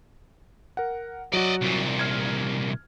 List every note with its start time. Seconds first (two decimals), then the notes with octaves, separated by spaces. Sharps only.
0.77 A#4 F#5
1.33 F#3 F#4 D5 D#5
1.62 C2 A#2
1.99 F6 G#6